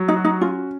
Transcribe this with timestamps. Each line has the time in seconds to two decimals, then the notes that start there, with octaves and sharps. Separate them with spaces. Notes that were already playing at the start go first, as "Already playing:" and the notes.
Already playing: F#3
0.08 D#4
0.17 F#4
0.24 D#4
0.41 C#4 F4